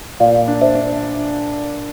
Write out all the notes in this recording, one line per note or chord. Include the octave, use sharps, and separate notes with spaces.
A#2 D5 F5
D4
C5 E5
D4